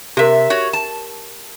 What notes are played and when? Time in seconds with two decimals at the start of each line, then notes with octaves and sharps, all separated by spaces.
0.17 C3 G4 A#4 E5
0.50 F#4 C#5
0.73 A5